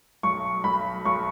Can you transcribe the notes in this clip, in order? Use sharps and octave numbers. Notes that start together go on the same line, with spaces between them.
B1 C#6
B1 B5
B1 C#6